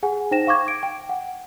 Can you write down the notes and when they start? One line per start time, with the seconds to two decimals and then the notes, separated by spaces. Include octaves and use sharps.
0.03 G#4 F#5 G#5
0.31 D#4 C5 G5 A#6 E7
0.47 F5 C#6 D6 G#6
0.68 D7
0.83 G5
1.09 F#5